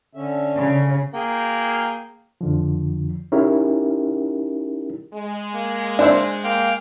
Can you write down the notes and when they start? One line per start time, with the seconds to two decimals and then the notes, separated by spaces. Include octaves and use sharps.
0.15 D3 C#4 E5
0.55 C#3
1.14 A#3 G#4 G5
2.41 F2 D3 F3
3.32 C#4 D#4 E4 G4 G#4 A#4
5.14 G#3
5.53 A#3
5.99 D4 C5 E5
6.44 A#3 F5 G5